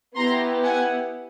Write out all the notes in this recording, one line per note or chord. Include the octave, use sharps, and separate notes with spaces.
B3 E4 G4 A#5 C6
F#5 G#5